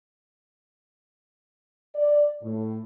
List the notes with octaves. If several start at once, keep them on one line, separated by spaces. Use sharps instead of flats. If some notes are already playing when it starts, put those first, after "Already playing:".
D5
A2